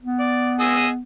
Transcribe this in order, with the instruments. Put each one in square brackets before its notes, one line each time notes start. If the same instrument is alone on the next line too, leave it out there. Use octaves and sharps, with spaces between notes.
[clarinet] B3
[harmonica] D5
G#4 D#5 E6